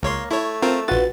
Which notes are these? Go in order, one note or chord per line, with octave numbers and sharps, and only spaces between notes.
C#2 A#3 C#5 C6
A3 E4 C#5
C4 F4 A#4
A#1 F4 F#4 B4 A6